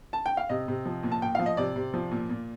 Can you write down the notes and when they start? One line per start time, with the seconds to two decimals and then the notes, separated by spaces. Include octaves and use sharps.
0.13 A5
0.26 G5
0.37 F5
0.49 C3 D#5
0.68 C3
0.86 F3
1.03 A#2
1.11 A5
1.22 A#2 G5
1.35 F3 F5
1.46 D#5
1.57 C3 D5
1.76 C3
1.94 F3
2.12 A#2
2.30 A#2